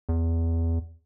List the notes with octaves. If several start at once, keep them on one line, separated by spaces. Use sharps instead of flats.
E2